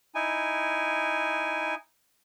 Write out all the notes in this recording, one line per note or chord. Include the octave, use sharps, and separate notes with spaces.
D#4 E4 G#5